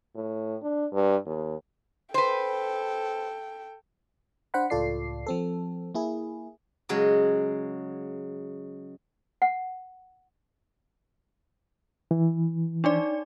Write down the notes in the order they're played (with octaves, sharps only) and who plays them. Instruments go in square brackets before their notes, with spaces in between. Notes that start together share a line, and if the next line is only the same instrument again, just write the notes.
[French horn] A2
D4
G2
D#2
[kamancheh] A4 G5 [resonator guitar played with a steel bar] B4 C5
[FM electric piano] D4 C5 F#5 B5
C#2 A2 F4 A4 D5 C7
F3 C4 A4
A#3 E4 G#4
[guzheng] C#3 F#3 G#3
[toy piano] F#5
[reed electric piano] E3
[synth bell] D4 D#4 D5